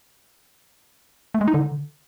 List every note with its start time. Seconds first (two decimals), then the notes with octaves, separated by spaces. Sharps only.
1.34 A3
1.41 G#3
1.48 D#4
1.54 D3